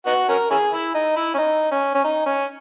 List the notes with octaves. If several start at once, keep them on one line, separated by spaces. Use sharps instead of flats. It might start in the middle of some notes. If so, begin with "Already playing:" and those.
B3 D#4 F#4
C#4 F#4 A#4
C#4 E4 G#4
E4
D#4
E4
C#4
D#4
C#4
C#4
D#4
C#4